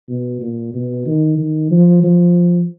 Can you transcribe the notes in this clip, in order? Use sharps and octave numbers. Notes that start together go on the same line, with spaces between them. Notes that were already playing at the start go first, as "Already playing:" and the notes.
B2
A#2
B2
D#3
D#3
F3
F3